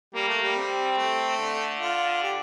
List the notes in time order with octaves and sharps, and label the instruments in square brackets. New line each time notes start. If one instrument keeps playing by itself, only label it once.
[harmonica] G3 [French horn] A#3
[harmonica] A3
G3
[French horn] C4
[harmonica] A3
[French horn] D3
[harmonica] F4
G4